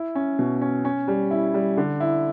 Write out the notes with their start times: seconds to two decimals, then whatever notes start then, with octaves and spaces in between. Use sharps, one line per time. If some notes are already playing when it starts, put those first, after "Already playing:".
Already playing: E4
0.15 C#4
0.39 B2
0.61 C#4
0.85 C#4
1.08 G3
1.31 E4
1.54 G3
1.77 D3
2.00 E4